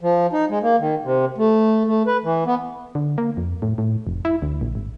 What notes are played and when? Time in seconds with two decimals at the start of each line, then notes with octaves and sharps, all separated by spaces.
0.01 F3
0.33 D#4
0.50 G#3
0.63 A#3
0.79 D#3
1.05 C3
1.38 A3
1.87 A3
2.07 B4
2.24 E3
2.47 B3
2.95 D3
3.18 A#3
3.37 F2
3.62 A2
3.78 A2
4.07 F1
4.25 E4
4.42 D2
4.61 A#1
4.75 G#1